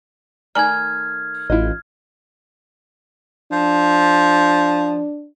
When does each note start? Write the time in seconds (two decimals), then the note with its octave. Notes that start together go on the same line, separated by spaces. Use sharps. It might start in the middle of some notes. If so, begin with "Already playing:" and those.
0.55 D#3 A3 D5 G#5 A#5 F6 G#6
1.50 A1 E4 F4 D#5
3.52 F3 D4